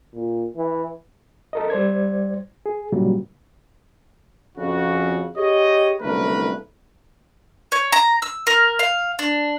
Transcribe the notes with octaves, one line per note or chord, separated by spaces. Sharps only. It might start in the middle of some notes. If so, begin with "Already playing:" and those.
A#2
E3
A4 A#4 D#5
G3 C5 D5 G#6
G#4
A#2 C#3 F#3 G3
F2 C#3 F#4
G4 G#4 C#5 D#5
F#1 C2 D3 A3 A#4 B4
C#5
A#5
E6
A#4
F5
D4